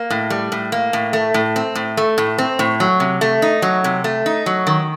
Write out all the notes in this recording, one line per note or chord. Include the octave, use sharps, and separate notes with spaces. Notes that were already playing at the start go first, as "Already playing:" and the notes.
Already playing: A#3
A2
G3
A2
A#3
A2
A3
A2
C4
A2
A3
A2
C4
A2
F#3
C3
A3
D#4
F#3
C3
A3
D#4
F#3
D#3